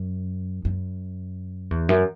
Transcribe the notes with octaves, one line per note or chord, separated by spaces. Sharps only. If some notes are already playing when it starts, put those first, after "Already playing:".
Already playing: F#2
F#2
E2
F#2